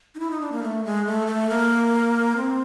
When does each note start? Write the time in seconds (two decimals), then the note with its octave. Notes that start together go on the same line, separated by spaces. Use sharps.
0.15 D#4
0.20 E4
0.31 D#4
0.41 D4
0.52 A#3
0.63 A3
0.85 G#3
1.06 A3
1.27 A3
1.49 A#3
2.36 C4